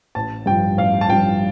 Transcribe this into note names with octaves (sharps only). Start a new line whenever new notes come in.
A1 A5
G2 F3 G5
A1 F5
A5
G2 F3 G5